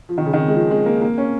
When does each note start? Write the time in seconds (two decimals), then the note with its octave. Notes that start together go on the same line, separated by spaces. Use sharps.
0.09 F3
0.18 D#3
0.25 C#3
0.33 D#3
0.48 G#3
0.55 F3
0.71 G#3
0.86 A#3
1.01 A#3
1.18 C#4